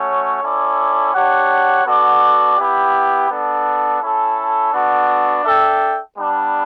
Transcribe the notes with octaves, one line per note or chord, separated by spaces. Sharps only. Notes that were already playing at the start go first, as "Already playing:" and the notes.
Already playing: A3 C#4 F#4 C#5
C#4 E4 A4 D5
D4 G4 C#5 F#5
B3 F#4 A4 D5
B3 E4 G4
B3 D4 A4
C#4 E4 A4
B3 D4 F#4 A4
D4 A4 E5 G5
G3 B3 D4